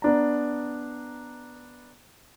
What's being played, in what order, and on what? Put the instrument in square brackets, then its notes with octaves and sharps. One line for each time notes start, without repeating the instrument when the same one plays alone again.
[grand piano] B3 D4 A#5